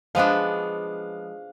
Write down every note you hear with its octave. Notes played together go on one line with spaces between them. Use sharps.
F3 G#3 B3 D4 F5